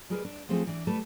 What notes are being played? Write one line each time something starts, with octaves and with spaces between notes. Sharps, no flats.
G3 G#3 G#4 A#4 B4
D4
F3 G#3 A3 C4 G4 G#4
E3 D4
G3 A3 A4 B4